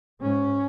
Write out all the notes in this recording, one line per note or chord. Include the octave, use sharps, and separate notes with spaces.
G#2 C#4